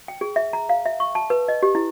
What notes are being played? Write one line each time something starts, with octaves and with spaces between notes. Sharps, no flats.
G5
G#4
E5
A#5
F5
E5
C#6
A5
B4
D#5
G4
E4